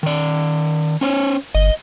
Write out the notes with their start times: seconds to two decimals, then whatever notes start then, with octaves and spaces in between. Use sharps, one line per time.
0.03 D#3 D5
1.01 C#4 C5 C#5
1.55 G1 D#5